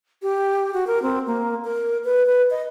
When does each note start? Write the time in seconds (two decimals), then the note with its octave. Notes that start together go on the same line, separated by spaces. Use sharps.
0.22 G4
0.74 F#4
0.87 A#4
1.02 C4
1.27 A#3
1.64 A#4
2.04 B4
2.27 B4
2.51 D#5